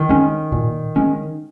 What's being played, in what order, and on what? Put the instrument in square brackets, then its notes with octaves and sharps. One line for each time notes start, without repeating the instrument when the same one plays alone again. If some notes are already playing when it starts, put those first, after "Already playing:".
Already playing: [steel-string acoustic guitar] D#3
[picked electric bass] G#3 C#4
A#2
G#3 C#4